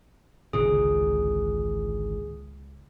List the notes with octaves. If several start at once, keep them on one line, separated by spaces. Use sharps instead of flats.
G#1 C#2 A#2 D3 G#4